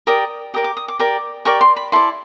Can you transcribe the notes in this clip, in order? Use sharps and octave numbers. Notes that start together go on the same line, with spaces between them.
G4 A#4 D5 D#6
G4 A#4 D5 D#6
D6
D#6
D6
G4 A#4 D5 D6
G4 A#4 D5 C#6
C6
B5
E4 A4 D5 C6